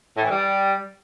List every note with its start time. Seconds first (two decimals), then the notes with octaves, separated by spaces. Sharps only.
0.17 A2
0.24 E3
0.31 G3